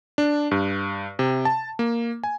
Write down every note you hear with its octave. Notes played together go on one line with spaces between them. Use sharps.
D4
G2
C3
A5
A#3
G#5